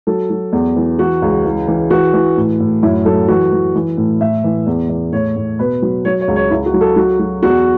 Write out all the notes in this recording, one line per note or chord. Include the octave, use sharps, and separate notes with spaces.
F#3 A4
F#3
E2
E3
E3 F#4
C#2
E3
E3
E3 F#4
E3
A2
A2
F#2 E4
F#3 A4
E3 F#4
E3
E3
A2
A2 E5
E3
E2
E2
A2 C#5
A2
B2 B4
F#3
F#3 C#5
C#5
C#2
C#5
C#2 E4
F#4
F#3
A4
F#3 F#4
F#3
E2 F#4